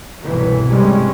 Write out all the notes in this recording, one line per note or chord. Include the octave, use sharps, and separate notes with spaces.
G1 C2 B2 E3 F#3
G1 C3 G3 G#3 C#4